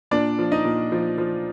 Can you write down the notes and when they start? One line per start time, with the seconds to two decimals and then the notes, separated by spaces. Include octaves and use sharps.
0.11 A#2 D4 D5
0.39 F3
0.52 D#4 D#5
0.65 A#2
0.92 F3
1.18 F3